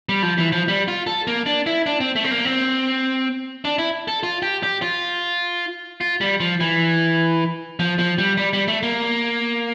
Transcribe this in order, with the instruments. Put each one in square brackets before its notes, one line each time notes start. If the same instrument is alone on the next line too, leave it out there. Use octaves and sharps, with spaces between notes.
[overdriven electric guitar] G3
F3
E3
F3
G3
F4
A4
A#3
D4
E4
D4
C4
A3
C4
A#3
C4
D4
E4
A4
F4
G4
G4
F4
F4
G3
F3
E3
F3
F3
G3
G3
G3
A3
A#3